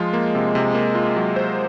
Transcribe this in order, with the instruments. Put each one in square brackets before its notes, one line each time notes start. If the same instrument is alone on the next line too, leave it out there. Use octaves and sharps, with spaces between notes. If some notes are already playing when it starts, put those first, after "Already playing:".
Already playing: [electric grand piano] F3 F4 [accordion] G#3
[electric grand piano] A#3
C3
C3
A#3
F4
F#3
C5